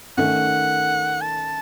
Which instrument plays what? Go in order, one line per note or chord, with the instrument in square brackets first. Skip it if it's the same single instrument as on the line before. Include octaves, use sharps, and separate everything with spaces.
[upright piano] D#3 A3 C#4 [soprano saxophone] F#5
[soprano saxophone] A5